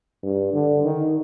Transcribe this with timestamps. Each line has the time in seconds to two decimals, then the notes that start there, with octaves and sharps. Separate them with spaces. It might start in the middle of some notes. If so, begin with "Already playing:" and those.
0.23 G2
0.53 D3
0.84 D#3